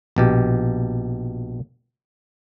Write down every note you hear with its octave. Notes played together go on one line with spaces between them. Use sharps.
A#1 B2 G4